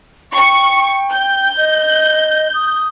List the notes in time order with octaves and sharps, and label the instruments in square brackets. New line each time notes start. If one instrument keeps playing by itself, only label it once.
[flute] G5 [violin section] C#6
[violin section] G6
[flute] D#5
D#6